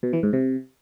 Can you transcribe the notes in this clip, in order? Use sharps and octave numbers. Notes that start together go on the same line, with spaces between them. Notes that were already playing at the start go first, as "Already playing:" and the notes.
B2
E3
G#2
C3